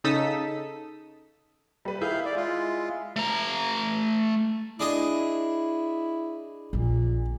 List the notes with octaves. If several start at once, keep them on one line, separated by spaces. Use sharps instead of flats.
C#3 D#4 A4 D#6 E6 B6
G3 B4
D#3 E4 G#4 F5 G6
D5
G#3 F4
A3 A#5
D4 E4 G#4 D#5
A#1 A#2 F3